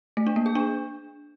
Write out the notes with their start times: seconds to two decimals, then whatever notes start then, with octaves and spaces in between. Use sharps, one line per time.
0.17 A3
0.27 D4
0.36 A#3
0.46 G#4
0.55 D4